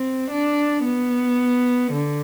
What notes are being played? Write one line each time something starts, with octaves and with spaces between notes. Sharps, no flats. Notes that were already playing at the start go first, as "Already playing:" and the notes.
Already playing: C4
D4
B3
D3